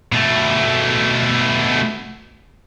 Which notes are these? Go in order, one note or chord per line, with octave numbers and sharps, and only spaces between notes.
B2 A3